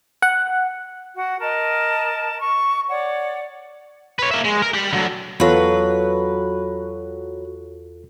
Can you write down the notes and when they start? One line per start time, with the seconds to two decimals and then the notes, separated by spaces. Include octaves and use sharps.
0.22 F#5
1.16 F#4 F#5
1.40 A#4 D#5 A5
2.41 C#6
2.89 C#5 D5 F#5
4.19 B4 C#5
4.31 A#3 E5
4.44 G#3
4.62 A#4
4.74 G4 B5
4.93 D3 F#3
5.40 E2 F#3 F4 A4 B4